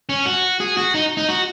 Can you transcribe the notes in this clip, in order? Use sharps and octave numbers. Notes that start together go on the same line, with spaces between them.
C#4
F#4
G#4
F#4
D#4
D#4
F#4